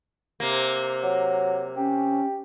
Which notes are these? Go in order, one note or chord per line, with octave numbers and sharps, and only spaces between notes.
C3 A#3
F#3
C#4 G4